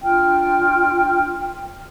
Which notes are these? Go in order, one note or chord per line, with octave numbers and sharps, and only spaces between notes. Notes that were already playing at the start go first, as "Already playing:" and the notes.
D4 F4 G5 F6